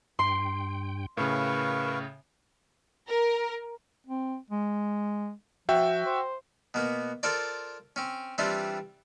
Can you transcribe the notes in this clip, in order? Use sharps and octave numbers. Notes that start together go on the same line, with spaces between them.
G2 G5 C6
A2 C#3 A#4 B4 F5 G5 C#6
A#4
C4
G#3
F3 F#4 E5 G5
C5
B2 A#3 B3
F4 A4 A#4 C5 D5
C4 C#4
E3 G3 C4 D4 E4 F4